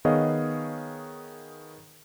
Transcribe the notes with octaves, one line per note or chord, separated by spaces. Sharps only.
D#3 B3 G#4 C#5 D#5 F5